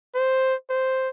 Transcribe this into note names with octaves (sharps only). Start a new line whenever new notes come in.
C5
C5